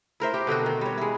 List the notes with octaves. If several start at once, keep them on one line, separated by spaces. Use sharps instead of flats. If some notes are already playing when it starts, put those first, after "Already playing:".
E4 A#4 C5 E5
G4
B2 D3 C4 F#4
D#3
G3 C#5
G#3 E4